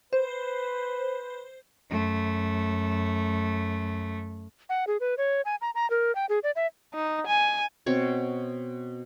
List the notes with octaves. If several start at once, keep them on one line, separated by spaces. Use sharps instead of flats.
B4 C5
F#2 A3
F#5
G#4
B4
C#5
G#5
A#5
A#5
A#4
G5
G#4
D5
E5
D#4
G#5
B2 C4 C#5